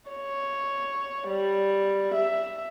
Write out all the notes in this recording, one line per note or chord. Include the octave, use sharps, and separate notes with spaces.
C#5
G3
E5